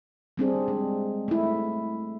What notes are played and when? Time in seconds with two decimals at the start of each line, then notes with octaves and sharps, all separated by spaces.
0.37 G3 C4 D4 G#4
0.68 G#3
1.28 A3 E4